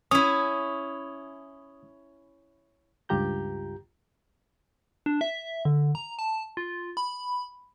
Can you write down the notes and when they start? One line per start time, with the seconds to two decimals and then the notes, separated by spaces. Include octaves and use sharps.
0.11 C#4 E4 D#6
3.09 C#2 G2 F4 G4 A#5 G6
5.06 D4
5.21 E5
5.65 D3
5.95 A#5
6.19 A5
6.57 F4
6.97 B5